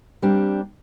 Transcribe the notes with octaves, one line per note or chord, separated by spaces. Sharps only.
G3 A#3 C4 D4 G4